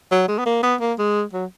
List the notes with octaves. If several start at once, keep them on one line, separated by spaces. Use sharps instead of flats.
F#3
G#3
B3
A#3
B3
A#3
G#3
F#3